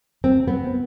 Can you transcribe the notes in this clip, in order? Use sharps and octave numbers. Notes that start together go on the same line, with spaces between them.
C4
B3